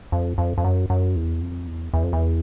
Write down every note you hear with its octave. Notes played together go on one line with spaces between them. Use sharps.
F2
F2
F2
F#2
F#2
E2
F2
E2
E2
F2
E2